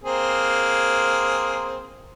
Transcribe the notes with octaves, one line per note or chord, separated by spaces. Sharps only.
A#3 C4 G#4